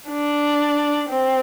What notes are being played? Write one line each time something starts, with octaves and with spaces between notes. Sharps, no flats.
D4
C4